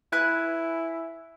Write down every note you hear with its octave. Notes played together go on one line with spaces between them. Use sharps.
E4 B4 G#5 F#6